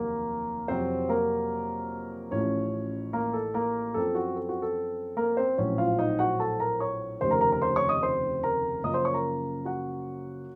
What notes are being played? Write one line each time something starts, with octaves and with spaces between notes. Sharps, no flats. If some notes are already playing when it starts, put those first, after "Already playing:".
Already playing: F1 D#2 D#3 F#3 A#3 A#4
F2 C3 F#3 C4 C5
A#3 A#4
A1 A2 F3 A3 C#4 C#5
A#3 A#4
A4
A#3 A#4
F#2 F3 C4 A4
F#4
A4
F#4
A4
A#3 A#4
C4 C5
A#1 A2 F#3 A3 C4 C#4 C#5
F4 F5
D#4 D#5
F#4 F#5
A4 A5
A#4 A#5
C#5 C#6
F1 D#2 C#3 A3 C4 C5 C6
A#4 A#5
A#4 A#5
A#4 A#5
C5 C6
C#5 C#6
D#5 D#6
C5 C6
A#4 A#5
F#2 C#3 F3 A#3 D#5 D#6
C5 C6
C#5 C#6
A#4 A#5
F#4 F#5